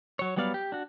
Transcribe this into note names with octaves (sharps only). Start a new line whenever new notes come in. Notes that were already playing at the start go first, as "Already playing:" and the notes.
F#3 C#5
F#3 G3 B3 D5 F5
G4
D4 F#4